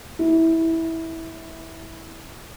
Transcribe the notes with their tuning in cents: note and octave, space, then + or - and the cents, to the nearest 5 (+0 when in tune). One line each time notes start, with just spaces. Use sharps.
E4 -15